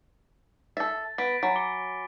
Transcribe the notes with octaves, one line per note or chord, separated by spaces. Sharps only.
A4 E5 A6
B3 A6 B6 D7
F#3 G#5 B5
D6 C#7 G7